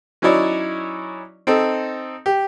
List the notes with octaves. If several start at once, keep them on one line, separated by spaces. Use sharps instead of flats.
F#3 C#4 D#4 E4 C#5 D5
C4 D#4 A4
G4